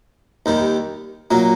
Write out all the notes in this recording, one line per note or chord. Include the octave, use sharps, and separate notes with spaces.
D#2 D#3 G3
A#2 F#3 A#3